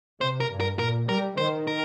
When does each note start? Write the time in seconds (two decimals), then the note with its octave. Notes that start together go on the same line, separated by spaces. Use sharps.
0.21 C3 C5
0.40 A#4
0.50 G2
0.60 A#4
0.79 A#2 A#4
1.09 G3 A#4
1.38 D#3 C5
1.67 A#4